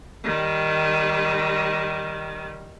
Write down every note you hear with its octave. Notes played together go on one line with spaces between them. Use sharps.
D#3 G3